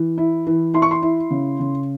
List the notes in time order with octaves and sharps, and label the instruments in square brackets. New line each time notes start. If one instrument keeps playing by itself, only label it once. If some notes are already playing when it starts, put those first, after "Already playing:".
Already playing: [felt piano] E3
E4
E3
E4 C6
C#6
C6
E4
C#3
C#3